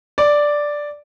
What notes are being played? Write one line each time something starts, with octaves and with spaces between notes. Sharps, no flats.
D5